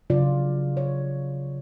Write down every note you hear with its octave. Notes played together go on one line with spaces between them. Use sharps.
C#3 F#3 F4 D5
C#5